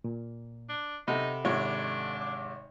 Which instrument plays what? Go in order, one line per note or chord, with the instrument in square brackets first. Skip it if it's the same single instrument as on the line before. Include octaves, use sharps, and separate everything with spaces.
[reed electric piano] A#2
[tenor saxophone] D4
[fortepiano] C3 [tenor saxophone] D#4 [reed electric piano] A4 F#5 B5
[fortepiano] G#1 C3 C#5 [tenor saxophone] D4
[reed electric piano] D6